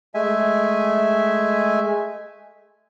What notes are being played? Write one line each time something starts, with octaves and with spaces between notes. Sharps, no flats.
G#3 A3 E5 G#5